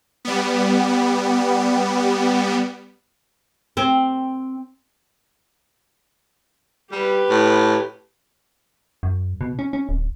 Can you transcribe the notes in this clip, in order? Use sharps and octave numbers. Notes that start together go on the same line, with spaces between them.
G3 B3
C4
G3 G4 B4
A2
F#2
B2
C#4
C#4
D1